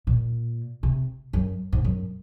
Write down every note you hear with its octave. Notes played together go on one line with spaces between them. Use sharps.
A#2
C3
F#2
G#2
F#2